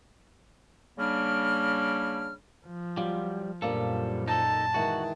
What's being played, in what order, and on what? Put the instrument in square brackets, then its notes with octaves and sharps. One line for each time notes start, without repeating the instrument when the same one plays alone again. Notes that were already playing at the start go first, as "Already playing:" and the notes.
[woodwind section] C#3 G3 A#3 D4 F6
[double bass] F3
[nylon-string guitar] F#3 F4 [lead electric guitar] G3
[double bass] F#2 A#2 [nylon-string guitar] F3 A#3 D4 [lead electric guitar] G3 A4
[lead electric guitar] D#4 A4 [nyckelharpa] A5
[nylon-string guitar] D#3 E3 G#3 [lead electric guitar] F#4